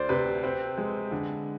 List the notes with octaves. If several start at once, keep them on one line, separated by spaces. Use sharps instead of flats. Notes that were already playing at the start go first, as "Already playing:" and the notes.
Already playing: D2 C5 D5
C3 B4
C4 B4
G#3
D3